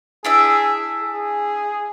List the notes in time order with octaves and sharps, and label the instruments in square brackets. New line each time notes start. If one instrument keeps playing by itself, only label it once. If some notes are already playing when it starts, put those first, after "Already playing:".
[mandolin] D4 E4 E5 [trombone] G#4
[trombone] G#4